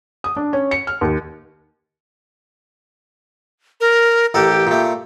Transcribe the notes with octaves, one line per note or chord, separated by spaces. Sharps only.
D#6
D4
C#4
C#7
F6
D#2
A#4
A1 G4 A4 A#4
A#2 A3